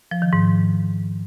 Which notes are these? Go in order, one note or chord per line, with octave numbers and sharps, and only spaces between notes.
F3
D#3
G#2